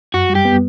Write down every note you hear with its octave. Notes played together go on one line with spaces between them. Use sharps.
F#2 F#4
G3
G4
B3